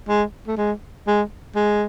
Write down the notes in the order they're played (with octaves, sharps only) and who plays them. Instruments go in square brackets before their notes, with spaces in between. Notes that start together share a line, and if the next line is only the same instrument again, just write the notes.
[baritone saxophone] G#3
A3
G#3
G#3
G#3